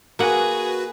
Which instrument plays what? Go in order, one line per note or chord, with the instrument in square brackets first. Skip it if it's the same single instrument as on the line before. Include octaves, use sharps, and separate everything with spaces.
[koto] A#3 F#5 [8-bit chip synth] F#4 B4 [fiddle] G#4